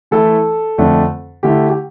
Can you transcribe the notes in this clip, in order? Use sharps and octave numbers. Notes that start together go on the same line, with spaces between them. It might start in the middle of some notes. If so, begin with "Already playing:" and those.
E3 A3 E4 A4
F2 D3 A3 D4
D3 A3 E4 G4
G4